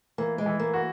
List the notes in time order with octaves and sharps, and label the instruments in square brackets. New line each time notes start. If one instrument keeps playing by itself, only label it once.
[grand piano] E3 [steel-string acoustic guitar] A#3
[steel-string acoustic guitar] G#3
[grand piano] E3
[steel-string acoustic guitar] A#3
[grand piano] F#4